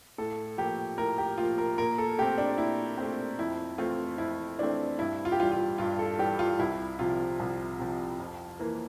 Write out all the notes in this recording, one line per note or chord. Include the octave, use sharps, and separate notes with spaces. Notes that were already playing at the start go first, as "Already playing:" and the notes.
A2 A4
F3 A#3 G4
A2 A#4
G4
F3 A#3 F4
A#4
A#2 A#4
A4
A3 C4 G4
D4
A#2 E4
A3 C4
F2 E4
E3 A3 C4 F4
F2 E4
E3 A3 C4 D4
G2 E4
F4
G4
E3 G3 F4
F4
G2 F4
A4
E3 G3 G4
F4
C2 E4
C3 F3 F4
C2
C3 F3
F2
E3 A#3